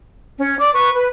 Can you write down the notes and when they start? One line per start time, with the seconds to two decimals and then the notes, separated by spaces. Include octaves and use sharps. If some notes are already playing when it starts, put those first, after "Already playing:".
0.39 C#4
0.60 D5 D6
0.74 B4 C#6
0.93 B4